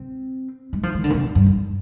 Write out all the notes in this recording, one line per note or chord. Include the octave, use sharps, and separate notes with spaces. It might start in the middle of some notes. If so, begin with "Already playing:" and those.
Already playing: C4
G#3
F3
D#3
D3
A#2
C3
G2
F2